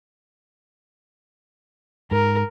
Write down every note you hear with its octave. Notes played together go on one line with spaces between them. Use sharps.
G#2 A#4